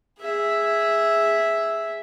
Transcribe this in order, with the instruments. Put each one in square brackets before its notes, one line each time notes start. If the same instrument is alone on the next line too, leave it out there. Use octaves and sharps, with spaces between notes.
[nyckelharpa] G#4 E5